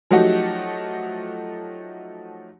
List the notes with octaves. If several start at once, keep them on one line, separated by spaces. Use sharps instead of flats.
F3 F#3 A3 D#4 F#4 G4